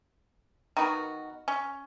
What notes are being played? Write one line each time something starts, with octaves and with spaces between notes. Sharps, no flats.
D#3 B3 F#4 A#4
C#4